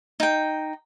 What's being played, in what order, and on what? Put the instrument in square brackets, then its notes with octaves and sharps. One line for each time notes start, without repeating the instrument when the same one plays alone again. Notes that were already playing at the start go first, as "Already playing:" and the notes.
[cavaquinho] D#4 G5